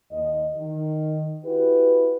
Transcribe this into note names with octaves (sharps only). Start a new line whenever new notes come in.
D#2 D#5
D#3
E4 F#4 G4 B4